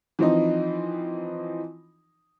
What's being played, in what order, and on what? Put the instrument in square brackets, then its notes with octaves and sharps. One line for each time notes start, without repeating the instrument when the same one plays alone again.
[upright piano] E3 F3 C4 D#4